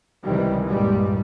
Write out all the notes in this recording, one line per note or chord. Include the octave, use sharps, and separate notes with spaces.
C#2 C3 D#3 E3 G3
C2 G2 A#2 G3 G#3